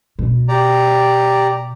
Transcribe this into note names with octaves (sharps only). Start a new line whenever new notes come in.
B2
G4 D5 A#5